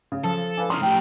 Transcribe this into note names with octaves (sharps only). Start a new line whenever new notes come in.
C#3
F3 A4
D4 B4 F5 G#5
C#3 E3 A#5 C6 D#6 F6
A2 G4 G5